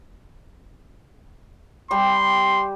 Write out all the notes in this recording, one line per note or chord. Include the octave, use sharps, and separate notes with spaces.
G3 G4 C6